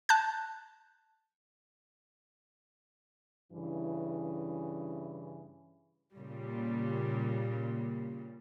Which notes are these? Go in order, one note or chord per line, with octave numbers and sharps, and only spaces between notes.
A5 F#6 G6
G2 C#3 E3
A#2 C#3 G3